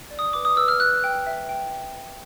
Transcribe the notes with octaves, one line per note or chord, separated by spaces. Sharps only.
D5
D#6
B4 D6
D#6
B4 E6
F6
B4 F#6
G5
E5
G5